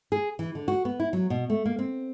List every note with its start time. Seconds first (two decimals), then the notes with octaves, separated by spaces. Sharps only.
0.12 G#4
0.39 E3
0.55 D3
0.68 F#4
0.85 B3
1.00 E4
1.13 F#3
1.30 B2
1.50 A3
1.66 A#3
1.79 C4